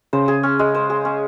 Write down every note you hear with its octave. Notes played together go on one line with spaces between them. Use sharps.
C#3 C5
G#4
C#4
G#3
C5
G#4
C#4